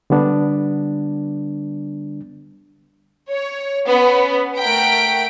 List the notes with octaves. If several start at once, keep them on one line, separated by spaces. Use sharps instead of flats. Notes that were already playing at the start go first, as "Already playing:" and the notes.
D3 G3 B3 D4
C#5
B3 C#4
A3 A#4 F#5 G5 B6 D7